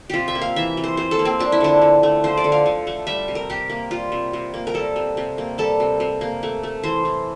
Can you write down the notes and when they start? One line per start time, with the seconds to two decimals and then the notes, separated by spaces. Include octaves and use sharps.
0.10 C3 F4 G4
0.28 E5
0.35 A#3
0.41 F5
0.56 E3 E5
0.77 C3
0.84 C5
0.97 C3 C5
1.11 A4
1.19 A#3
1.25 C4
1.39 F3 D4
1.52 E4
1.61 D3 D4
1.81 D3
2.03 A3
2.24 F3 C5
2.37 D5
2.44 D3
2.52 F5
2.66 D3
2.87 A3
3.07 G3 E5
3.28 C3
3.35 A#4
3.50 C3 G4
3.70 A#3
3.91 G3 F4
4.12 C3
4.33 C3
4.54 A#3
4.67 A#4
4.74 G3 A4
4.96 C3
5.17 C3
5.38 A#3
5.58 G3 A4
5.80 C3
6.00 C3
6.21 A#3
6.43 A3
6.63 A3
6.83 E3 C5
7.05 E3